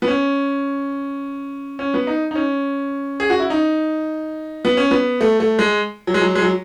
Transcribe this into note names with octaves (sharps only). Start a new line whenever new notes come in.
B3
C#4
C#4
B3
D#4
D#4
C#4
G#4
F#4
E4
D#4
B3
C#4
B3
A3
A3
G#3
F#3
G#3
F#3
G#3
F#3